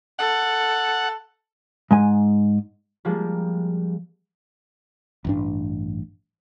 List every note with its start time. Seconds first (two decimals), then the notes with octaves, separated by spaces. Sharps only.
0.19 A4 F#5
1.91 G#2 G#3 G#5
3.05 F3 G3 G#3 A#3
5.25 A1 G2 D4